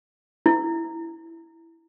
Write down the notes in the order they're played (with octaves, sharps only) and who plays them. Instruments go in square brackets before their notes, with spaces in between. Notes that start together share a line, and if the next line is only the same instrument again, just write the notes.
[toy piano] E4